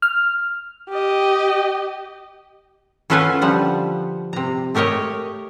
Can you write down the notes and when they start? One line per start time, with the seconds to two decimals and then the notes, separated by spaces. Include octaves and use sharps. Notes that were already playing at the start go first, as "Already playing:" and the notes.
0.02 F6
0.90 G4 D#5
3.10 C#4 F4 A4 B4 F#5 G#5
3.41 D3 F3 G3 F#5
4.33 C3 A#5
4.75 A3 G4 A#4 C#5 D#5